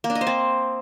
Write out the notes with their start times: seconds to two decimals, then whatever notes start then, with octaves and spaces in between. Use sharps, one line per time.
0.04 A#3
0.10 D4
0.15 D#5
0.21 C5
0.27 C4